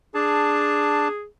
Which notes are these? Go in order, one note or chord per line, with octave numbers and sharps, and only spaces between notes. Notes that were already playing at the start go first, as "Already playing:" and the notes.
D4 G#4 A5